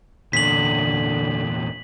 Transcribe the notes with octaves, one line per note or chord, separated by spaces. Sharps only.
E2 A#2 D3 B6 F#7